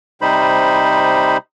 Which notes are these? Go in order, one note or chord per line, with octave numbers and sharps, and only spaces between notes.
C3 G3 D#4 C5 B5